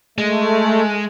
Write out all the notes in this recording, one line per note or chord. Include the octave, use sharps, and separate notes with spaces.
G#3 A3